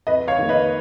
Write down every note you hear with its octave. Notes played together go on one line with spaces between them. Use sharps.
F2 B4 D#5
C#5 F5
D#3 A#3
B4 D#5